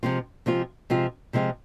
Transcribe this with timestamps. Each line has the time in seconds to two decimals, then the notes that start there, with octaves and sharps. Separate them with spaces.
0.03 C3 F3 G#3 C4 F4
0.46 C3 F3 G#3 C4 F4
0.90 C3 F3 G#3 C4 F4
1.33 C3 F3 G#3 C4 F4